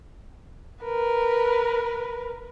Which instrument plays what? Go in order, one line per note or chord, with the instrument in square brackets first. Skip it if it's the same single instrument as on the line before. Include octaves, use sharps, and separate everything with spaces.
[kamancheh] A#4 B4